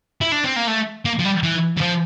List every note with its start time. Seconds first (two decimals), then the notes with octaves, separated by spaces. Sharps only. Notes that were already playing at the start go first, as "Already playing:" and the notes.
0.21 E4
0.32 D4
0.44 C4
0.56 A#3
0.67 A3
1.05 A#3
1.19 F3
1.25 G3
1.43 E3
1.77 E3
1.81 F3